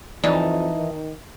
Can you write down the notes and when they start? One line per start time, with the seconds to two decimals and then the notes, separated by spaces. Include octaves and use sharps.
0.24 F2 E3 D#4 D5 A5
0.77 D#3